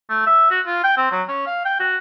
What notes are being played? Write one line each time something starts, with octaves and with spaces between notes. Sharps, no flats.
A3
E5
F#4
F4
G5
C4
F#3
C#4
F5
G5
F#4